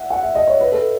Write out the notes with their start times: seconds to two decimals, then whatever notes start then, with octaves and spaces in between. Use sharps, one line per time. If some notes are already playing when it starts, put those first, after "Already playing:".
Already playing: E5 F#5
0.10 F#5
0.23 E5
0.35 D#5
0.47 C#5
0.61 B4
0.72 A4